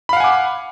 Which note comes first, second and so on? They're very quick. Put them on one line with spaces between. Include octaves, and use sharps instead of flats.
B5 F5 F#5 G#5 D6